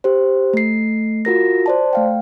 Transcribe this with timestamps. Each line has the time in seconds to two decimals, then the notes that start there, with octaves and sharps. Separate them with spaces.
0.04 G4 C5
0.53 A3 C7
1.25 F4 F#4 A#4 A#6
1.66 C5 D5 A5
1.93 A3 F5 G5